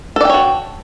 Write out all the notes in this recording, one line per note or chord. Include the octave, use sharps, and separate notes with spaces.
F#4 A4 C#5 D5 G5